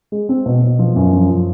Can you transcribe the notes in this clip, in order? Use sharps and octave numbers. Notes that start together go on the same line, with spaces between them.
G#3
C4
B2
B2
F3
F#2
F3
F3